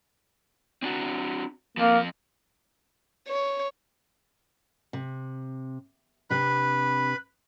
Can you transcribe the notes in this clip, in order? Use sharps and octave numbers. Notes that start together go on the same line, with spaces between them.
C4 D4 F#4
F3 A#3 C4
C#5
C3
C3 D4 B4 B5